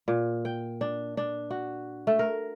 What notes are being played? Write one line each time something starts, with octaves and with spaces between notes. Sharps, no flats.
A#2
G5
D4
D4
F#4
A3
A#4